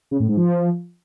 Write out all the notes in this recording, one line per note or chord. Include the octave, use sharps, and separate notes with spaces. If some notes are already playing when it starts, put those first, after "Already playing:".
C#3
A2
G#2
F3